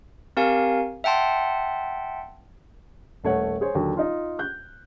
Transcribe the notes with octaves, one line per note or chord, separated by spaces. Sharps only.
C4 G4 A#4 F5 G#5
E5 F#5 G5 A5 C6
D#1 A3 C#5 F#5
G#4 C5 C#5
D#2 D3 F#3
D#4 F4
F#6 G6